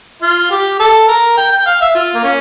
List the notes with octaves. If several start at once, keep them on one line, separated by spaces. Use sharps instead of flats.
F4
G4
A4
A#4
G5
G5
F5
E5
F4
A#3
C#4